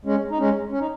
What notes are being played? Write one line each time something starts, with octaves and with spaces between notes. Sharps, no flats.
G#3 C#4
D#4
G#3 C#4
C#4
D#4